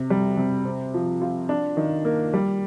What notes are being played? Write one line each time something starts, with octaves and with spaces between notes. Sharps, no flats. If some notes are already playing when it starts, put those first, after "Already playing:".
Already playing: C3
G3
C3
C4
F3
F4
D4
D#3
A#3
G3